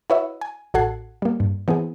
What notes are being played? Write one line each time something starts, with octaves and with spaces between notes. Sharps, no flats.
E4 F#4 B4 C#5 D#5 E5
G#5
A1 F#4 A4 F#5 G#6 C7
G3 A#3
G2
E3 B3 C4 G#4